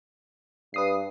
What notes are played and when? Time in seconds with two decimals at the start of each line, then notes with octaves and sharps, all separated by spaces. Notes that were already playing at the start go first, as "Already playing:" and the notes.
0.74 G2 B4 D#6 C7